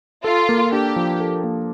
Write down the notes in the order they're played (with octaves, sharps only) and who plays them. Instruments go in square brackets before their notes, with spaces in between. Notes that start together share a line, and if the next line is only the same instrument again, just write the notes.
[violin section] F4 [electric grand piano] A4
[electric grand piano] A#3
[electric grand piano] D4 [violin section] G4
[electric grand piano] F3
A4
A#3